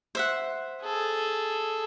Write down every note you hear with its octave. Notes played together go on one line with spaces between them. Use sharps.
C5 E5 F#5
G#4 A4